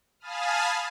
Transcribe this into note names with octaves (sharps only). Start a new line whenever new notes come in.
F5 G#5 A5 B5 D#6 F6